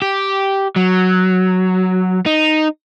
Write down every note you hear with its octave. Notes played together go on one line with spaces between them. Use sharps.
G4
F#3
D#4